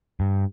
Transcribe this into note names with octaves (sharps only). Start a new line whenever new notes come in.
G2